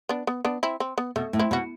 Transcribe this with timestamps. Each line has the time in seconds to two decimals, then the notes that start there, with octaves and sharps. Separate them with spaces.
0.09 B3 D4
0.27 B3
0.45 B3 D4
0.63 C4 E4
0.80 C4
0.98 B3
1.16 B2 A3
1.33 A2
1.39 C4 E4
1.51 B2 F#4